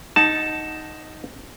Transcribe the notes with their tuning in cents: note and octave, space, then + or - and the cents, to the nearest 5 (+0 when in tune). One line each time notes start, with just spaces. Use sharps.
D#4 +0 F#5 +0 A5 +0